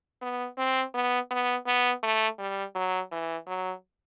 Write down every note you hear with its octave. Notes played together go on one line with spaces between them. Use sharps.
B3
C4
B3
B3
B3
A3
G3
F#3
E3
F#3